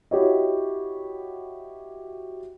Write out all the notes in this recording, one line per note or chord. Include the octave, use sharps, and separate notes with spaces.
E4 F#4 G4 C#5 D#5